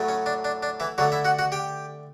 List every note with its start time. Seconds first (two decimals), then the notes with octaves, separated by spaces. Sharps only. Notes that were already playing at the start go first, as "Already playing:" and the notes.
Already playing: A2 F#3 A3
0.08 C#4
0.26 D4
0.44 D4
0.63 D4
0.80 E3 E4
0.98 D3 F#3 A3 F#4
1.12 E4 E5
1.25 F#4 F#5
1.39 F#4 F#5
1.52 G4 G5